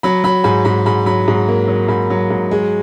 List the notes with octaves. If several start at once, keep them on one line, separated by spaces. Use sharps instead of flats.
F#3 B5
F#3 B5
G#2 B5
G#2 B5
G#2 B5
F#3 B5
G#2
A#3
F#3
G#2 B5
F#3
G#2
G#3